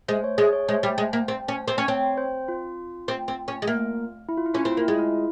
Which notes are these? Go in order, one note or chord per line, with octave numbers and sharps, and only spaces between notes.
G#3 C5
C#5
G#3 G#4
C#5
G#3 C5
G3
G#3
A#3
C4
C#4
C4
C#4
C4 C#5
C5
F4
C4
C4
C#4
G#3
A#3
E4
F4
E4
C#4 F4
C4 E4
F4
A#3 E4
G#3 F4
E4